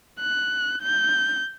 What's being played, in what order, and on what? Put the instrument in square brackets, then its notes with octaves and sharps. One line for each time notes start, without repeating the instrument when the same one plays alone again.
[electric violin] F#6
G6